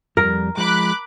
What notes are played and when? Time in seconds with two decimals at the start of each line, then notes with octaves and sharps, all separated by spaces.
0.17 F2 G3 A#4
0.57 F3 G#3 B5 D6 F#6